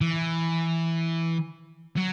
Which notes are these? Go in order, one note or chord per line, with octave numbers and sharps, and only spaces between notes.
E3
F#3